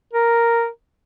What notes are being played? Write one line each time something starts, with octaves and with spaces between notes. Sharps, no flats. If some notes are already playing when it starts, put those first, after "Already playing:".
A#4